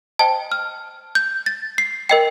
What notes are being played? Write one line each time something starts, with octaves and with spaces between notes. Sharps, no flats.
C5 D#5 G5 A5
F6
G6
A6
C7
A#4 D#5 G5 C7